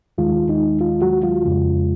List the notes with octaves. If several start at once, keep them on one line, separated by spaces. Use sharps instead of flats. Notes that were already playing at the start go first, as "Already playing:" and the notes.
D#2 D#3 G#3 F4
D#4
F4
F#3 F#4
F4
F2 C#3 G#3